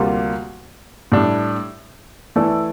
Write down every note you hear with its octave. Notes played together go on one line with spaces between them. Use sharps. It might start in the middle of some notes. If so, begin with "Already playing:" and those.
Already playing: D2 C3 G3 A#3 F4
A2 G3 D4
E3 A3 E4 A4 D5